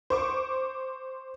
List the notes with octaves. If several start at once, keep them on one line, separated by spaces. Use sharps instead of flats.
C5 C#6 D6